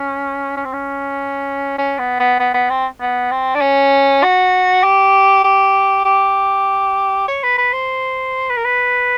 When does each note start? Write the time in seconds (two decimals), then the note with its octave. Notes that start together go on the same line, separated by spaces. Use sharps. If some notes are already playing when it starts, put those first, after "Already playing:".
Already playing: C#4
0.57 C#4
0.65 C4
0.73 C#4
1.78 C#4
1.99 B3
2.20 B3
2.39 B3
2.54 B3
2.70 C4
3.01 B3
3.31 C4
3.55 D4
3.61 C#4
4.23 F#4
4.83 G4
5.44 G4
6.05 G4
7.28 C#5
7.43 B4
7.58 B4
7.73 C5
8.50 B4
8.57 A#4
8.65 B4